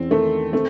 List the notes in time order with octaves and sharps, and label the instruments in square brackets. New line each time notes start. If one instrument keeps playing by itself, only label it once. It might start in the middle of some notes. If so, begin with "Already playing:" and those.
Already playing: [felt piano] E2 C#4 [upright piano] C4
[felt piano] D#3 [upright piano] A3
[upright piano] A3 [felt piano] C4